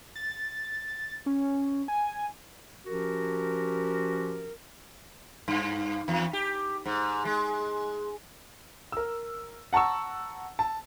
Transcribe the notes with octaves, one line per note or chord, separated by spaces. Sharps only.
A6
C#4
G#5
F3 C#4 F#4 G4 A#4
G2
E2
G4
G#2
G#3
A#4 E6
F#5 A5 A#5 C#6 E6
A5